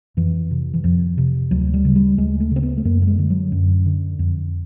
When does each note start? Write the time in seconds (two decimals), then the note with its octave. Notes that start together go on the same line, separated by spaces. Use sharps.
0.17 F2 E3
0.51 C3
0.74 E3
0.84 F2 F3
1.18 C3
1.51 D2 F#3
1.74 G3
1.85 C#3
1.95 G3
2.18 D2 G#3
2.40 A3
2.51 C#3 C4
2.63 B3
2.77 A3
2.85 F#2 A#3
3.02 A3
3.07 G#3
3.19 D3
3.30 F#3
3.52 F#2
3.86 D3
4.19 F2